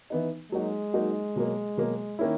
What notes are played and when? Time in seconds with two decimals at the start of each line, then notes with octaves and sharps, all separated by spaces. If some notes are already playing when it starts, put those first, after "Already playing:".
0.10 E3 B3 D#4
0.51 F#3 G#3 A#3 D#4 F#4
0.94 F#3 A#3 D#4 F#4
1.36 B2 F#3 A#3
1.77 B2 F#3 A#3
2.19 D#3 A#3 C#4 E4